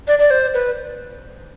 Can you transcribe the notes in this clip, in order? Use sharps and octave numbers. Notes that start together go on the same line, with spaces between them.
D5
D5
C5
B4